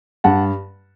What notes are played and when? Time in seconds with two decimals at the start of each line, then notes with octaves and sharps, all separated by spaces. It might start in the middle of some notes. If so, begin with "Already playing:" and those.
0.24 G2 F#5 A5